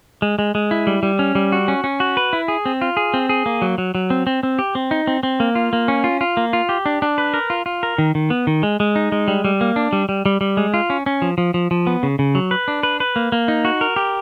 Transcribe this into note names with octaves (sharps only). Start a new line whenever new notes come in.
G#3
G#3
G#3
E4
G3
G3
C#4
G3
F#4
C#4
C#4
F#4
B4
E4
G#4
C4
F4
G#4
C4
G#4
A#3
F#3
F#3
F#3
C4
C4
C4
G4
C4
D#4
C4
C4
A#3
F4
A#3
C#4
F4
F4
A#3
F4
G4
D4
D4
B4
A#4
F4
F4
A#4
D#3
D#3
B3
D#3
G#3
G#3
D#4
G#3
G3
G3
A#3
D4
G3
G3
G3
G3
G#3
F4
C#4
C#4
F3
F3
F3
F3
B3
C#3
C#3
F#3
B4
D4
B4
B4
A#3
A#3
D#4
F#4
A#4
G4